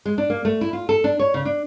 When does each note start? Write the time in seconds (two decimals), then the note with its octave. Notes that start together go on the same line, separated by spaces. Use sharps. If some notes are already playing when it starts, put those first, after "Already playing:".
0.05 G#3
0.18 D4
0.30 A#3
0.45 A3
0.61 E4
0.73 F4
0.89 A4
1.04 D4
1.19 C#5
1.34 C#3
1.45 D4